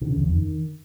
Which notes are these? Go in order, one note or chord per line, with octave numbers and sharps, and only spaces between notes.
D3
C#3
E2
F2
D#3